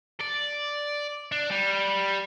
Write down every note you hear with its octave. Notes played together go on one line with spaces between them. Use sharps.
D5
D4
G3